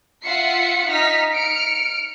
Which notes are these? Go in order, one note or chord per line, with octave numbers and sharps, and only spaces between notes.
F4 E5 F#5 C7 C#7
D#4 F6 B6
F6 C#7 D7